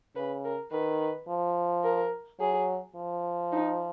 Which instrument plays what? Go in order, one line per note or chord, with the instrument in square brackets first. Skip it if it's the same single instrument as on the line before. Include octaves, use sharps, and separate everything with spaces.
[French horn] C#3 [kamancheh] B4
[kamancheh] A#4
[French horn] D#3 [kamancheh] B4
[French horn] F3
[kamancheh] A#4
[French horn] F#3 [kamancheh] G#4
[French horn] F3
[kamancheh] D#4